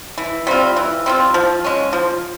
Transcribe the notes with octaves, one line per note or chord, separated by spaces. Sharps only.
E3
G3 C4 F4
E3
G3 C4 F4
F3
G#3 C#4
F3